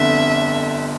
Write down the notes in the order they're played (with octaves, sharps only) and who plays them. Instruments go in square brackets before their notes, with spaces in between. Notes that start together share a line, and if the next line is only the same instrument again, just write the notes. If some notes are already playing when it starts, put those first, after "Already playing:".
Already playing: [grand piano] G1 F2 D3 [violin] E5